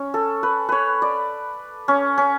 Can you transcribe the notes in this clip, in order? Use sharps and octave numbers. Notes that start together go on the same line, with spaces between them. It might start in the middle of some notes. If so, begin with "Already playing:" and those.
Already playing: C#4
A4
B4
B4 C#5
D5
C#4
C#4